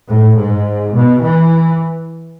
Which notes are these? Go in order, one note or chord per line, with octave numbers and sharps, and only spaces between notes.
A2
G#2
B2
E3